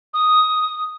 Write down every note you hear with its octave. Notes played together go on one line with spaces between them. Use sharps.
D#6